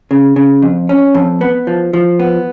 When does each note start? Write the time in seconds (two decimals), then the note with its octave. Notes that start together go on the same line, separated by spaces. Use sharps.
0.11 C#3
0.36 C#3
0.62 F2
0.89 C#4
1.15 F2
1.41 B3
1.67 F3
1.93 F3
2.19 B3